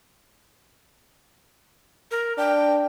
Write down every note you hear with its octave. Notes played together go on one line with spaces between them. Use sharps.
A#4
D4 G5